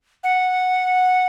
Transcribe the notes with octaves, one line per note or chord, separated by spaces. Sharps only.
F#5